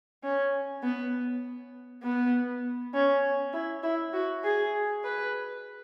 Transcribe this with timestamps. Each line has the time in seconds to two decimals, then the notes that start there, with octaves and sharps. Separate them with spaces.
0.23 C#4
0.83 B3
2.03 B3
2.94 C#4
3.53 E4
3.83 E4
4.13 F#4
4.44 G#4
5.04 B4